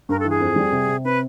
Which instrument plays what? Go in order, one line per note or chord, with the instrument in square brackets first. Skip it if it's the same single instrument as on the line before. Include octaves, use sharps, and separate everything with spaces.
[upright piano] G2 [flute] A#4
[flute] A4
[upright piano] E3
[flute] G#4
[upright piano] F2
G3
C3
C3
[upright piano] C4 [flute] B4